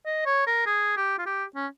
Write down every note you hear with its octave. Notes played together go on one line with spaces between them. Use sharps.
D#5
C#5
A#4
G#4
G4
F4
G4
C#4